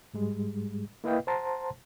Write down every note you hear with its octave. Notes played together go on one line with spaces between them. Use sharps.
G#2 G3 G#3
A#3 E4 B4 D#5 F5 G5
C5 F#5 A5 A#5 C6